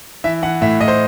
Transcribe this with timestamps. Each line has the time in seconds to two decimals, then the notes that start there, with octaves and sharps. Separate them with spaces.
0.24 E3 E5
0.42 E3 F#5
0.61 A2 E5
0.80 A2 D#5
0.88 C5